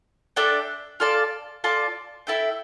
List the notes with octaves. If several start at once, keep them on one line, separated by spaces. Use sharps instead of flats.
D4 A4 E5 G5
F4 A4 D5 A5
F4 A4 D5 A5
E4 A4 E5 G5